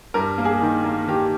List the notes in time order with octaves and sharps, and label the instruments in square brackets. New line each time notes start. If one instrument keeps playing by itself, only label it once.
[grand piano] G2 A#4
A#3
G#4
D#3
A#3
D#3 G4